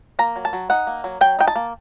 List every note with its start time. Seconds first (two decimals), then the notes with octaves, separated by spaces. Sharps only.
0.19 A#3 A#5
0.36 F#3
0.45 A5
0.53 F#3
0.70 D#4 F#5
0.87 A#3
1.04 F#3
1.21 F#3 G5
1.39 D#4 G5
1.48 A5
1.56 A#3